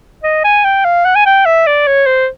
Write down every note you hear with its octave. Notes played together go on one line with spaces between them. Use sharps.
D#5
G#5
G5
F5
F#5
G#5
G5
E5
D5
C#5
C5